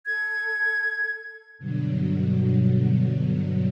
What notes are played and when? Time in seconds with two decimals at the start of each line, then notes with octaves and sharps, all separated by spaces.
0.06 A4 G#6
1.59 G2 B2 D3 F#3